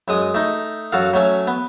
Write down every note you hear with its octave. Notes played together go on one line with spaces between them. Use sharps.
F#2 G#3 D#6
A3 D#4
F#2 F#4 A4 F5
F#3 A3 C#4
B3